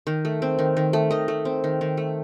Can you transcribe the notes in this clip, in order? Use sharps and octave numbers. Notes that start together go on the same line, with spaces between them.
D#3
A3
C4
D#3
D#3
A3
D#3 D#5
A3
C4
D#3
D#3
A3